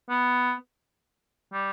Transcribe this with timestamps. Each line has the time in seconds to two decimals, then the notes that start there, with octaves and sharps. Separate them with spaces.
0.10 B3
1.53 G3